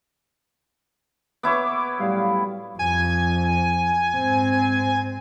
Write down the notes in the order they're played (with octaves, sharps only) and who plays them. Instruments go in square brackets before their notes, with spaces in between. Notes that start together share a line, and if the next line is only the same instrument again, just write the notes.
[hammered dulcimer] B3 E4 C#5 [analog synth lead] D6
[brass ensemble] A2 F#3 G3 [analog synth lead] F5
[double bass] F2 [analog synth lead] G#5
[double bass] G#2 C4